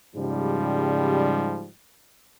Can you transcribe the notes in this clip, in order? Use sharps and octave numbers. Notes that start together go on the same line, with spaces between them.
G#2 C#3 F3 G3